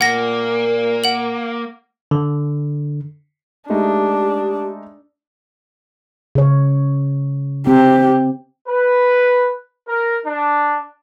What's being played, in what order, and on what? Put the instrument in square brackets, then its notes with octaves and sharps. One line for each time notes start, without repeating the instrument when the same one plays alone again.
[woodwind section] A#2 [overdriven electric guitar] A#3 [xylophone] F#5 A#6
[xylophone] F#5 F#7
[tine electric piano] D3
[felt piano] G#3 A3 D#4 [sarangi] D4 [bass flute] G4
[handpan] C#3 C#5
[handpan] C4 [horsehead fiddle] G4
[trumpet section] B4
A#4
D4